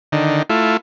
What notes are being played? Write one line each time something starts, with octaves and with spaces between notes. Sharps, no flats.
D3 D#3
A3 E4 F4